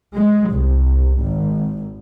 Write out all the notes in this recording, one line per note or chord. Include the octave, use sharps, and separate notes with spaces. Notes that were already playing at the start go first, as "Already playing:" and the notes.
G#3
C2
G#1